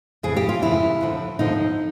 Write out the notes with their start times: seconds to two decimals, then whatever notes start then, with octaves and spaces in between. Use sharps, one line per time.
0.23 F2 C#3 E3 G#4
0.37 G4
0.49 F4
0.62 F2 C#3 E3 E4
1.01 D#2 D3 F3
1.39 D#2 D3 F3 D#4